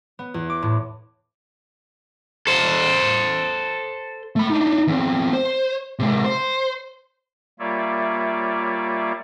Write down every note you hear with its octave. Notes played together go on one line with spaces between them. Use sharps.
B3
E2
D6
A2
A4 C5
A3 B5
D4 D#4
E2 C4
C5
C3 G#3
C5
G3 A#3 F4 C#5 D5 E5